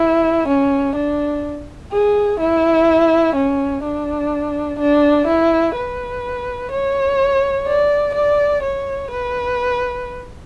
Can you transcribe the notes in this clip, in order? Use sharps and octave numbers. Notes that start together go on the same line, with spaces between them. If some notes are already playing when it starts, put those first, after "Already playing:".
Already playing: E4
C#4
D4
G#4
E4
C#4
D4
D4
E4
B4
C#5
D5
D5
C#5
B4